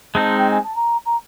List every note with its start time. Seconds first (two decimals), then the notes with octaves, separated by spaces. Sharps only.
0.15 G#3 C4 D#4 A5
0.38 G5
0.51 G#5
0.64 A5
0.76 A#5
1.06 A#5